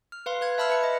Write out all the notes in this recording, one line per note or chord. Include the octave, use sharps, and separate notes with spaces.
F6
B4 F5 C6
B4 F#6 G#6
E5 A5 B5 E6 F6
B4 B5 C#7
D#5